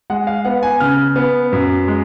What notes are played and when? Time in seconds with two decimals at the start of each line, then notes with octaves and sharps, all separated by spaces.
0.10 G#3 F#5
0.27 F5
0.45 B3 F#5
0.63 G#5
0.80 C#3 F6
1.16 B3
1.53 F#2
1.88 G#3